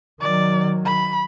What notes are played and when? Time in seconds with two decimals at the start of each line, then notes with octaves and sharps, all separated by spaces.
0.21 D#3 F#3 D5
0.85 B5